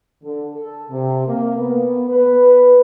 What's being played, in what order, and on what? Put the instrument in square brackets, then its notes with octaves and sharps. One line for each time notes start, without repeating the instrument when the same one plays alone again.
[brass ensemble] D3
A4
C3
A#3
B3
B4